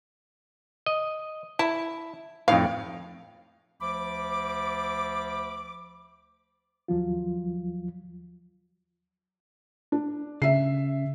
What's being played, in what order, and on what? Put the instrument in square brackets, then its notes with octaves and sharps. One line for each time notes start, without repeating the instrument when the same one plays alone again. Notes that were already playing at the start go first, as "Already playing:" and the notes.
[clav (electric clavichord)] D#5
[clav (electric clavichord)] E4 [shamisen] A5
[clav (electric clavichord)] F2 A2 [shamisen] D#4 C#5 F5
[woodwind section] D2 F3 B5 D6
[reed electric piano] D#2 F3 F#3 F4
[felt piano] D4
[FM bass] C#3 [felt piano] E5 C7